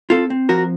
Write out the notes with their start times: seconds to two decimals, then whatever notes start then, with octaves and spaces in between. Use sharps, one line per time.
0.10 C4 F4 A4
0.30 C4
0.49 F3 F#4 A#4